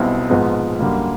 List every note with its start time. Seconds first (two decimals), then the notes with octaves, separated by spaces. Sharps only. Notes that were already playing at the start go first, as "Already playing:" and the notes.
Already playing: B1 B2 G3 C4 E4
0.29 A#1 G#2 F3 G#3 B3
0.79 F#2 D3 G3 A#3